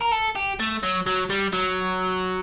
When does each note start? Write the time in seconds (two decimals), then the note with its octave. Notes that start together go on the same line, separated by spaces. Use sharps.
0.02 A#4
0.13 A4
0.36 G4
0.59 A3
0.83 F#3
1.06 F#3
1.30 G3
1.53 F#3